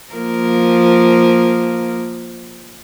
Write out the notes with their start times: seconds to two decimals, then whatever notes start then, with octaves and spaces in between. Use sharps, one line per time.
0.13 F3 A#3 A#4